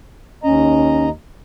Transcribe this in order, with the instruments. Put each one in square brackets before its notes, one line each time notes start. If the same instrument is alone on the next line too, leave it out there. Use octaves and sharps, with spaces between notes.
[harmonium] D#2 D#5 A#5 [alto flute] C#4